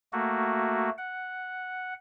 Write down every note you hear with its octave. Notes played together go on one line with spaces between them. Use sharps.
A3 A#3 F#4
F#5